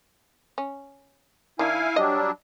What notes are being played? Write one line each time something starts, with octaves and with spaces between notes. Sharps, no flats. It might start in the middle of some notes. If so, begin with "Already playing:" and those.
C#4
D#3 D4 E4 F5 G#5
F#3 G3 D4 D#5